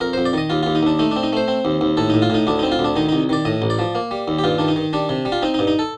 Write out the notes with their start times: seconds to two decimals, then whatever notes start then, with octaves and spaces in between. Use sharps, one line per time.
0.01 F2 A#4
0.13 F2 C5
0.25 D5
0.33 D#3 D#5
0.50 D#2 F4
0.63 D#2 F4
0.75 D#4
0.83 D#2 D4
0.99 A3 D#4
1.11 C4 D4
1.23 D#4
1.33 A3 C5
1.48 C4
1.65 D#2
1.81 D#2
1.97 A2 A4
2.10 A2 D#4
2.22 F4
2.30 A2 D#4
2.47 D2 D4
2.59 C4 D#4
2.72 F4
2.79 D2
2.84 D4
2.96 D#3 D#4
3.09 C2 D#4
3.29 D#3 D5
3.45 A2 D#5
3.62 A1
3.70 D5
3.79 F3
3.95 A#3
4.11 G3
4.28 D#2
4.39 G4
4.44 G2 F4
4.58 D#3 D4
4.68 D#4
4.76 D#3
4.93 G3 D4
5.09 C3
5.25 G3
5.32 F4
5.42 C4 D#4
5.54 D#4
5.59 G2
5.67 D#4
5.79 A4